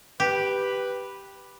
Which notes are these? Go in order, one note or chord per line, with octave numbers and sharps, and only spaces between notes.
G4 B4